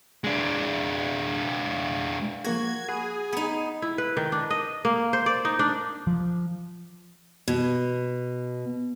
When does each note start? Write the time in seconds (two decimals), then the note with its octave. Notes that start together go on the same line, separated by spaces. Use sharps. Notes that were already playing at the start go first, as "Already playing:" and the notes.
0.24 G#3 D4
2.44 F3 A#3 F#4 G#4 G#6
2.89 G#4 F#5 B5
3.32 B3 D#4
3.82 E4
3.98 B4
4.17 D#3
4.32 D4
4.50 D#5
4.85 A#3
5.13 C5
5.26 D5
5.45 D#4
5.59 D4
6.07 F3
7.48 B2